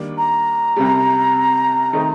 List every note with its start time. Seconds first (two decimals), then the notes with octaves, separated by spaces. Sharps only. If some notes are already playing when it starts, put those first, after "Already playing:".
Already playing: D#3 G3 A#3 D4
0.18 A#5
0.76 C2 C3 G3
1.93 D#3 A3 C4 D#4